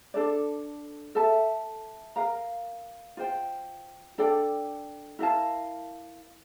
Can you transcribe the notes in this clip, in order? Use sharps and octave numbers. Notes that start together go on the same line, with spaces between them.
D4 A4 D5
A4 E5 A5
A#4 F5 A#5
F4 C5 G5
D4 A4 D5 G5
E4 A#4 F5 A5